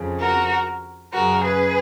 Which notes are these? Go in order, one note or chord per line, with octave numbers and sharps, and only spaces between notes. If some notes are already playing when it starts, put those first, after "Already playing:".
Already playing: F2 C#3
F#4 A#4
F#2 C#3 F#4 A#4
G#4 B4